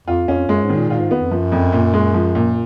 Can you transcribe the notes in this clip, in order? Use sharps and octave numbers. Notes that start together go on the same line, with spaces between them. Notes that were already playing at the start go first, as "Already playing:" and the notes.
F2 F4
F2 C#4
F#2 G#3
G#2
D#3
A#2
A#2 F4
G#2
B3
F2
F#2 F3
F2
A#2
G#3
F3
A#2